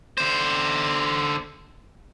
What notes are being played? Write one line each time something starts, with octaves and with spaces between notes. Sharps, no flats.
D3 C5